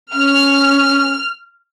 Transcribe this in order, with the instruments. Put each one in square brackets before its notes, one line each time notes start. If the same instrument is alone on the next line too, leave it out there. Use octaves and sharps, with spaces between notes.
[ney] C#4 [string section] F6